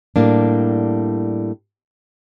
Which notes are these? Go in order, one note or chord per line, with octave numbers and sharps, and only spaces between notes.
A2 G3 A#3 D4